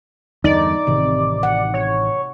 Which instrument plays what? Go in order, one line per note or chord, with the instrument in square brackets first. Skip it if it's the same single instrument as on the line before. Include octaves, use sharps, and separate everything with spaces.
[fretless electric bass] E2 G2 D3 [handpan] D#4 [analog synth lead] D5
[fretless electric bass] A1 D#3 [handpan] C3
[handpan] F#5
[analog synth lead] C#5